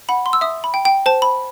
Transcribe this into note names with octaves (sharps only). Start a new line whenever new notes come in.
F#5 B5
C6
E6
E5 D#6
B5
G5
G5
C5 A5
B5